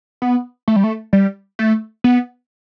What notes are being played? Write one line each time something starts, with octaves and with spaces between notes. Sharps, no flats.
B3
A3
G3
A3
G3
A3
B3